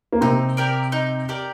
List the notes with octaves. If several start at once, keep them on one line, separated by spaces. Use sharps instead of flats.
A#3
C3 C4 D#4
G4 A#4 D5
D#4
G4 A#4 D5